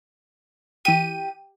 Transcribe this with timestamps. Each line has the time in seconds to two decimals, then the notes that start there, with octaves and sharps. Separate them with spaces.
0.85 E3 G4 D#7